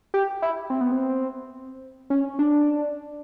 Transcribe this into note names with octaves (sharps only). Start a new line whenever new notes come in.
G4
E4
C4
B3
C4
C#4
D4